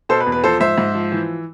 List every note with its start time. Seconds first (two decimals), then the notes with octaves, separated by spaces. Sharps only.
0.09 B2 A4 C5
0.20 B4
0.27 E2
0.32 B4
0.44 F3 A4 C5
0.60 G#2 C5 E5
0.78 G#2
0.95 F3
1.12 E3